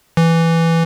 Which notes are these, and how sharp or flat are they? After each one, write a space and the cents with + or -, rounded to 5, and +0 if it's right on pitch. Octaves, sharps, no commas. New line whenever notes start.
E3 +5